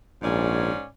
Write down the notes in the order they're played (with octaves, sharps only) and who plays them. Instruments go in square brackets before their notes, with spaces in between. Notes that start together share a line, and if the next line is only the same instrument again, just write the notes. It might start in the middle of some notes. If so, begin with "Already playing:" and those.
[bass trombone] A#1 [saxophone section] G#2 C#4 D5